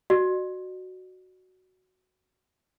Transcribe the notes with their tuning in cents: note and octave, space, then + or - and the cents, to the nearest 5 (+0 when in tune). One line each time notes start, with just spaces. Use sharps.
F#4 +0 D5 +45